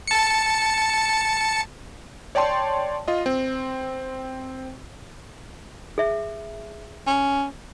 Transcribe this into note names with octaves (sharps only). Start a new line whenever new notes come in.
A5 C#7
C#5 D5 G5 A5 C6
F4 D#5
C4
G#4 E5
C#4